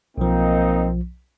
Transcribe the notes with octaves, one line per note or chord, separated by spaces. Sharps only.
B1 F3 A#3 C4 D#4